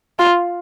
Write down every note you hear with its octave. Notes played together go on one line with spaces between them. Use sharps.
F4